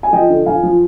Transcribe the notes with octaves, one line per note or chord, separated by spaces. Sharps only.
G#5
F3 D#5 G5
D3
F2 F5 G#5
F3